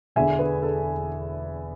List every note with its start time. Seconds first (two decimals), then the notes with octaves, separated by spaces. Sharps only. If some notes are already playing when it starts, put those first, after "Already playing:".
0.16 E1 E2 D3 E5 G#5
0.39 G#4 B4
0.63 A4